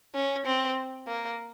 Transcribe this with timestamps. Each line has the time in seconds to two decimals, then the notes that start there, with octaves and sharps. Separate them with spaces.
0.15 C#4
0.46 C4
1.07 A#3